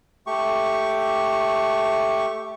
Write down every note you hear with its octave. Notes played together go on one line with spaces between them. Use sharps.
A3 G4 C#6